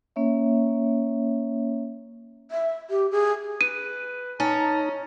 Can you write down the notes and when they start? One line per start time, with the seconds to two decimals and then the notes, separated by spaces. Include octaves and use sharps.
0.16 A#3 C#4 C#5 E5
2.51 E5
2.90 G4
3.11 G#4
3.61 B4 D#7
4.40 C#4 D#4 A5 A#5